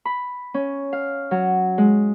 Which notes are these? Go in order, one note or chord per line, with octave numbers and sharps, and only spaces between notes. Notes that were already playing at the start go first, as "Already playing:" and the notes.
B5
C#4
F5
F#3
G#3